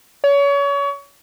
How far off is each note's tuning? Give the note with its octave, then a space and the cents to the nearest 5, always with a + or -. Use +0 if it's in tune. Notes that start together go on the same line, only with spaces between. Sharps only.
C#5 +30